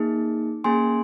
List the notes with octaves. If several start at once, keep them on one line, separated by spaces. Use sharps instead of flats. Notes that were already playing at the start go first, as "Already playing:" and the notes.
Already playing: A#3 D#4 G#4
A#3 C#4 G#4 G#5 C6